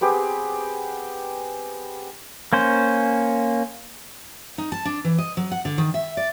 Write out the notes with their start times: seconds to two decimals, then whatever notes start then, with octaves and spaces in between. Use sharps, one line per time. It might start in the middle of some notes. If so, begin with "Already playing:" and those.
0.01 B3 C4 G4 G#4
2.53 A#3 C#4 C5
4.58 D#4
4.72 A5
4.85 D4
5.04 E3
5.18 D#5
5.37 F#3
5.52 F#5
5.65 D3
5.78 D#3
5.94 E5
6.17 D5